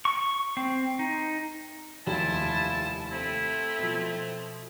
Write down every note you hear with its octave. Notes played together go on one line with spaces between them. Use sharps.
C#6
C4
D#4
F1 D#2 E4 F4 A5
A3 C4 E4
B2 F3